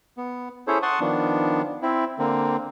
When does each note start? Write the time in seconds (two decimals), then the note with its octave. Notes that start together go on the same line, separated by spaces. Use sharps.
0.17 B3
0.67 C#4 E4 G#4 A4 C5 C#5
0.83 F#5 A5 C6 C#6 D#6
1.00 D#3 F3 B3 D4
1.82 C4 E4
2.19 D3 A#3 C4